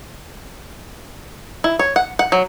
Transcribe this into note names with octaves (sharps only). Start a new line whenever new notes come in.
E4
C#5
F#5
F#5
F#3